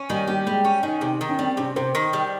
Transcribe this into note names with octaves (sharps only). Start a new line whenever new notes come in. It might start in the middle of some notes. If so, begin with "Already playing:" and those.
Already playing: C#4
D#3 G3
G3 G4
G3 G#3
C#4
D#3 D#4
C3 D#4
D#3
C#4
G3 C4
C3 C#4
C3 C5
D#3
G3